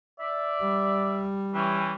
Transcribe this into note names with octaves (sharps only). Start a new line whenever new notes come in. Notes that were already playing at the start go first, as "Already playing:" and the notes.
D5 E5
G3
E3 C#4 G5